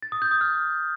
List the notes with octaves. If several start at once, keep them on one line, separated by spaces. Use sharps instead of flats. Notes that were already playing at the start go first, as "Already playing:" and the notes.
A6
D#6
G6
D#6
F6